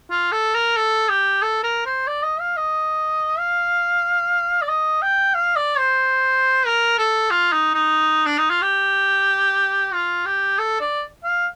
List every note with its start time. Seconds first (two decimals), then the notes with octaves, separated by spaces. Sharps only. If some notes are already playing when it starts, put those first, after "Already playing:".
0.11 F4
0.32 A4
0.55 A#4
0.77 A4
1.09 G4
1.42 A4
1.63 A#4
1.86 C5
2.08 D5
2.23 D#5
2.40 F5
2.57 D#5
3.39 F5
4.62 D5
4.69 D#5
5.02 G5
5.34 F5
5.56 D5
5.78 C5
6.66 A#4
6.98 A4
7.31 F4
7.52 D#4
7.74 D#4
8.26 D4
8.38 D#4
8.50 F4
8.62 G4
9.93 F4
10.26 G4
10.58 A4
10.80 D5
11.24 F5